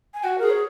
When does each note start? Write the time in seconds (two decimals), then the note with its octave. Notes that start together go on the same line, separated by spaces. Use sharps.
0.14 G#5
0.23 F#4 F#5
0.38 G#4 A#4
0.50 C#5